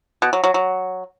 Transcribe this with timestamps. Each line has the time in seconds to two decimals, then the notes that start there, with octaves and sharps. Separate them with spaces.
0.22 B2
0.33 F#3
0.44 F#3
0.54 F#3